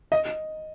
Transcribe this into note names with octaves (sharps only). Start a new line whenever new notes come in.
D#5